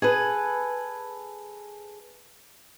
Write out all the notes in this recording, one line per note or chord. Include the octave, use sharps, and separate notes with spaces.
G#4 A4 B4